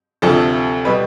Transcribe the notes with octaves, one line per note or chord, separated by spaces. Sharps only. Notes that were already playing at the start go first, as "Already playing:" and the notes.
D2 C3 F3 A4
B2 G3 B4